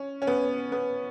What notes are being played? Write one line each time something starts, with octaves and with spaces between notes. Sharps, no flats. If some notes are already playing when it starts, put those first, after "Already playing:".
Already playing: C#4
C#4
B3
B3